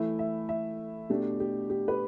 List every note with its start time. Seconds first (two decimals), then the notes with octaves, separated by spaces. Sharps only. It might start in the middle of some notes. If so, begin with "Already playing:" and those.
Already playing: E3 A3 E4 E5
0.19 E5
0.49 E5
1.10 B2 A3 D4 G4
1.40 G4
1.70 G4
1.88 B4